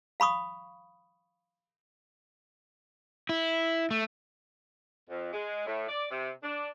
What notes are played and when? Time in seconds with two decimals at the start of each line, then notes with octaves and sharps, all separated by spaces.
0.20 F5 B5 C#6 D#6
3.29 E4
3.91 A3
5.10 F2
5.33 G#3
5.66 A2
5.88 D5
6.11 C3
6.43 D4